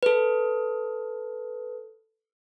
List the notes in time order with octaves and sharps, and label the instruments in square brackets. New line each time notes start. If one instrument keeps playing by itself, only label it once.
[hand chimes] A4 B4